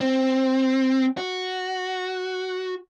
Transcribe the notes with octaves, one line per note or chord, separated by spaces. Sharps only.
C4
F#4